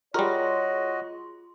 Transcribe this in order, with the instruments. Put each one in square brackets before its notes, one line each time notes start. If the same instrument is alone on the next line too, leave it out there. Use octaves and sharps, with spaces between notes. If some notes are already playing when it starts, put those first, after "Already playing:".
[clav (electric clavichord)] G3 A#4 [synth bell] F4 G#4 C6 [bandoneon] F#4 D#5 [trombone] C#5